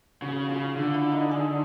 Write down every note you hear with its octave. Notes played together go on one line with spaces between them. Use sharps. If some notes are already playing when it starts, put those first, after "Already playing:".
C#3 F#4
C#3 F4
D3
E4
D#4
G#4